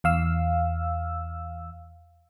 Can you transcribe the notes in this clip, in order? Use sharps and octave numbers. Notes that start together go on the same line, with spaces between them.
E2 F5 E6